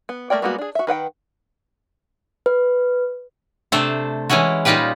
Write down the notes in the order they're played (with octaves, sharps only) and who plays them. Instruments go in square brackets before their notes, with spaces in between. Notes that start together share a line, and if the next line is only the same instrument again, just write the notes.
[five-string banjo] B3
A3 A#3 A#4 D5 G5
G3 G#3 A#3 B3 F#4
D4 G#4
F#4 E5
D#3 B4 F#5 G5
[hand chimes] B4
[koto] C3 A3 D4 A4 C5
E3 G#3 C#4 E4 F#4
A#2 G3 D#4 F4 G4 B4